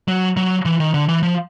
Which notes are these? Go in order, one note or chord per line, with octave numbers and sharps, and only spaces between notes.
F#3
F#3
E3
D#3
D3
E3
F3